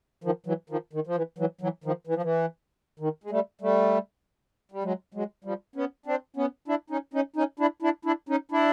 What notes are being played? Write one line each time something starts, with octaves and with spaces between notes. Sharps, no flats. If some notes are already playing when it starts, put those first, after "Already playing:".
D#3 F3
E3 F#3
D#3 F3
D#3
F3
E3
E3 F#3
E3 F#3
D#3 F3
E3
F3
E3
D#3
G#3
G3 A3
G3 A3
G3
F#3 G#3
F#3 G#3
F3 G3
B3 C#4
C4 D4
B3 C#4
D4 E4
C#4 D#4
C#4 D#4
C#4 D#4
D4 E4
D4 E4
D4 E4
C#4 D#4
D4 E4